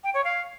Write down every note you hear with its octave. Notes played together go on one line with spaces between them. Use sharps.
G5
C#5
F5